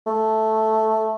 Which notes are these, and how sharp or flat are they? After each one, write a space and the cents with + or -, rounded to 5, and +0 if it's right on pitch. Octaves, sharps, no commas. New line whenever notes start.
A3 -5